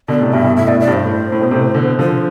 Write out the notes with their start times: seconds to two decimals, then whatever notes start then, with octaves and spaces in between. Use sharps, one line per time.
0.08 B2 D3 D5
0.20 A2 C3
0.33 G2 B2 E5
0.44 G2 B2
0.57 A2 E5
0.68 B2 D5
0.73 A2
0.80 D5
0.88 G2
0.93 C5
1.04 A2
1.32 A2
1.41 B2
1.51 A2 C3
1.74 B2 D3
1.99 D3 F3 C5